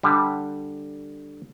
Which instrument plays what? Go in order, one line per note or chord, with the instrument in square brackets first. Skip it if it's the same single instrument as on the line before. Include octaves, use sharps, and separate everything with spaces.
[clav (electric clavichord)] D3 G3